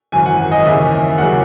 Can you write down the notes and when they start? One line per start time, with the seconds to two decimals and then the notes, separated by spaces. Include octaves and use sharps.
0.12 G#1 F#2 E3 G#5
0.26 F#5
0.52 D#5
0.66 D#2 C#3 E3 E5
1.18 D#2 C#3 F#3 F#5